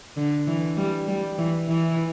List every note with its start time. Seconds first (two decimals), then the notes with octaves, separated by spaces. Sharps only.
0.17 D3
0.47 E3
0.77 G3
1.08 G3
1.38 E3
1.68 E3